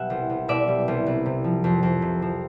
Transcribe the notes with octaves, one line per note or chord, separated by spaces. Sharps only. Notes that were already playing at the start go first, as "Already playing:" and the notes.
Already playing: B2 G3 E5 F#5
C2
C2
B2 D5 E5
G3
C2
C2
C3
F3
F2
F2
C3
F3